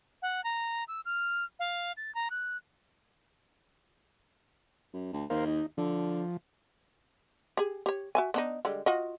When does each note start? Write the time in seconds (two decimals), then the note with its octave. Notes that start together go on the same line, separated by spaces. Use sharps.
0.22 F#5
0.44 A#5
0.88 E6
1.05 F6
1.59 F5
1.97 A6
2.15 A#5
2.30 F#6
4.93 F#2
5.13 D2
5.30 D#2 A#4 C5 F5
5.47 D#4
5.78 D3 F3
7.57 G4 G#4
7.86 G4 C#5
8.15 F#4 E5 G#5
8.34 B3 D4 D#4
8.65 D3 G3 G#3
8.86 F4 F#4 D#5